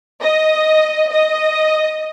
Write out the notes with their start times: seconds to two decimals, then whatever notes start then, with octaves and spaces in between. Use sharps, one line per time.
0.22 D#5
1.11 D#5